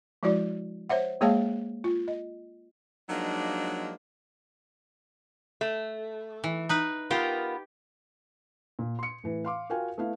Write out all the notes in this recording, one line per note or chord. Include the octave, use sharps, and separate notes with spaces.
F3 G#3 E4 F#4 D5
C5 C#5 E5 F#5
G#3 A#3 G#4 C#5 F5 A5
F4
D#5
F3 F#3 G#3 A#3 D4 D#4
A3
E3
D#4 B4
B3 F4 G4 A#4
A#2
C6 C#7
A2 E3
F5 C6 D6
F4 F#4 A#4 F5 G5 G#5
A3 B3 E4 F5